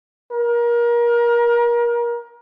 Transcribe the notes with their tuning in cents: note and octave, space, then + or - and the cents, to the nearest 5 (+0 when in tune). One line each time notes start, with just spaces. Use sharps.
A#4 +30